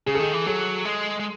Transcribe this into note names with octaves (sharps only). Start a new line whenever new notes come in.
C#3 G#4
A4
D#3 G#4
E3
F#3 A4
G#3
G#3